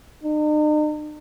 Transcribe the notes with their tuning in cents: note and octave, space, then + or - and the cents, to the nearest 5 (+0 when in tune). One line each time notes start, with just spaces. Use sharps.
D#4 -45